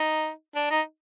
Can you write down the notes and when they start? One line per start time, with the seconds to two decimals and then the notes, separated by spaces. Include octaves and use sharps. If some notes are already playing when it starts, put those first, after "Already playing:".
Already playing: D#4
0.56 D4
0.70 D#4